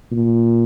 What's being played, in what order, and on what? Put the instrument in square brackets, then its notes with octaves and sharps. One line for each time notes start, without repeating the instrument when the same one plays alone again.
[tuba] A#2